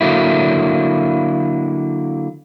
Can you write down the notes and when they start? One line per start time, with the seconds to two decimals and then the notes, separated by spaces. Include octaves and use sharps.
0.01 D3 F#3 A#3 E4